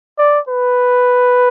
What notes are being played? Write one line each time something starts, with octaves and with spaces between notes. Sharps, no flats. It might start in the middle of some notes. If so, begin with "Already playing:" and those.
D5
B4